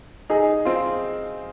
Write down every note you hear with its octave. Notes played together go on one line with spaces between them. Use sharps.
D#4 G#4
C4 F4